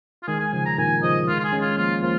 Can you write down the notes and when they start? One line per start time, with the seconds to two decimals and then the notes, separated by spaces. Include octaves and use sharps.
0.23 F4
0.28 D#3 G#3 G#4
0.40 G#5
0.53 C#3 F3 G#5
0.66 A#5
0.78 A#2 D#3 G#5
1.03 C#3 F3 D#5
1.28 D#3 G#3 F4
1.40 F4
1.44 G#4
1.52 G#3 C#4
1.61 F4
1.78 F3 A#3 F4
2.02 F3 A#3 F4